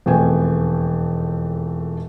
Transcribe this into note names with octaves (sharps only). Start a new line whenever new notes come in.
E1 F2 A3 G5 G#5